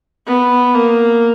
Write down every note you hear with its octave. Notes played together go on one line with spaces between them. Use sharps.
B3
A#3